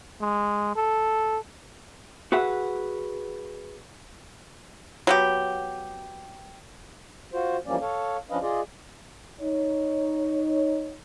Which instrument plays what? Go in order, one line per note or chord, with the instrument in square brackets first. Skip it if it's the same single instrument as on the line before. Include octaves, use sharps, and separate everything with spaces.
[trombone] G#3
A4
[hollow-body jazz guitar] F#4 G#4 B4 E5 F#5
[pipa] F#3 B3 G4
[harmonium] F4 F#4 C5
E3 F3 G3 A#3 C#4 D5
A4 C#5 F5
F3 C#4 D4 B4 D#5 F5
F4 G#4 D5 D#5
[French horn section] D#4 C#5